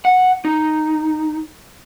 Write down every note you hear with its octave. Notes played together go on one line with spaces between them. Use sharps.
F#5
D#4